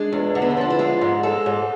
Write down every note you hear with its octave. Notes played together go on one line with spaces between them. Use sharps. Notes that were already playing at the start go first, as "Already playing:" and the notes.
Already playing: G#3 D4
E2
D3
B3
C4
F3 D4
E4
G#3 F4
G#2
G#3 A4
G#2